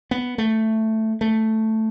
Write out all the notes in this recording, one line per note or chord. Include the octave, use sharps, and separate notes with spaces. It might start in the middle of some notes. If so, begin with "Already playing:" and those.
B3
A3
A3